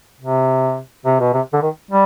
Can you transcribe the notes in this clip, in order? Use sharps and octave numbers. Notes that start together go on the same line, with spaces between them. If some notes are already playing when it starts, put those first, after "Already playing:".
C3
C3
B2
C3
D3
D#3
G3